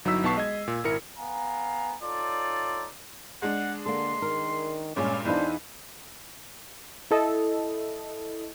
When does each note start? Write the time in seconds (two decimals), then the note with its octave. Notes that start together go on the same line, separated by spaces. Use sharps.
0.05 G1 F#3 D#4 E4 E6 B6
0.23 B1 B3 A5 C#6 C7
0.36 G#3 D#5 G#6
0.68 A#2
0.84 G#1 E4 A#4 C#7
1.18 B3 F5 G#5 A#5
2.03 D#4 F4 A4 C#5 D5
3.42 G#3 D4 F#5
3.86 D3 A#3 A4 C6
4.22 D#3 A#4
4.96 G2 A#2 G#3 C#4 D5
5.25 E2 E3 D4 D#4 B4 C5 F5
7.11 E4 A4 D#5